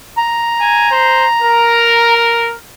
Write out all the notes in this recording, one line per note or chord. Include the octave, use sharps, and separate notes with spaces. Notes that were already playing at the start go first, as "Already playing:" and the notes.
A#5
G#5
C5
A#4